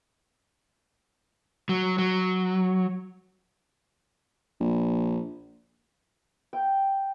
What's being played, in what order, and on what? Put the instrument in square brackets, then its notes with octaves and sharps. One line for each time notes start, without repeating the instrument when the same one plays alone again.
[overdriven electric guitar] F#3
F#3
[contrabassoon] A#1
[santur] G5